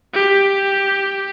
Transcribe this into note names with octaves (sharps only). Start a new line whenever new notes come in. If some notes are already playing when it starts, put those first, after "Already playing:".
G4